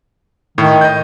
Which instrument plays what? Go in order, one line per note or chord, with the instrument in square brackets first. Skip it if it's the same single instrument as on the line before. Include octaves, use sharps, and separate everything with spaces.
[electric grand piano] A2 [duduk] D#3
[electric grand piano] D#5 G6